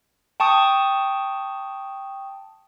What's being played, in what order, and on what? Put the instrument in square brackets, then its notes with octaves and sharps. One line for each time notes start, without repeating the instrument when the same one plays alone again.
[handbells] G5 A5 C#6 D#6